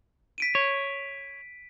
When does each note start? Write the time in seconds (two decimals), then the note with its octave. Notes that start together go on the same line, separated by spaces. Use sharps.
0.38 B6 D7 D#7
0.55 C#5